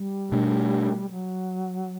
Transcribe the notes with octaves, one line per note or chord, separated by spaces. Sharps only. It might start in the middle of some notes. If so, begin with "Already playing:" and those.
Already playing: G3
B2 A3 D4
F#3